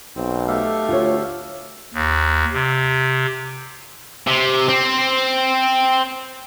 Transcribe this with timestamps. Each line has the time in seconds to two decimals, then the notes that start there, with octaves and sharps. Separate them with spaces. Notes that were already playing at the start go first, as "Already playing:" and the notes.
0.16 B1 C4
0.48 A3 G4 A4 F5
0.89 D2 F4 C#5
1.94 D#2
2.53 C3
4.27 C3
4.69 C4